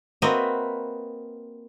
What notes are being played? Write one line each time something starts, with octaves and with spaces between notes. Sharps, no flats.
A#3 C4 F#4 B4 D#5 E5